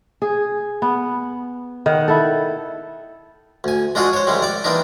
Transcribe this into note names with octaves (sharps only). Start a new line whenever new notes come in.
G#4
B3
D#3 F#5
E4 A4
D2 G#5
G#3 D4 F4 F#4 G#4
C5 C#5
C2 G3 G#3 C4
D5 D6
E3 A#3 C4 D4 D#4